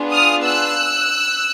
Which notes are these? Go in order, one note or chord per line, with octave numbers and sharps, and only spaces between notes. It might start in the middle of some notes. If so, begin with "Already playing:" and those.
Already playing: B3 D4 F4 G#4
D#6 F6
E6 F#6